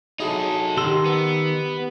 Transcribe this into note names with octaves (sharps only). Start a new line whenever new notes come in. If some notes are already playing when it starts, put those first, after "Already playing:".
F#3 D#4 E4 G#4 A4
D#3 G4 F5 C6 E6
B3